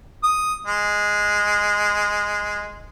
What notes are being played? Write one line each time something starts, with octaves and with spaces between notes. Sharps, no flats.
D#6
G#3